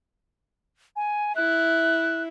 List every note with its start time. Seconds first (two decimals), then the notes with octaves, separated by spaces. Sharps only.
0.96 G#5
1.36 E4 F#6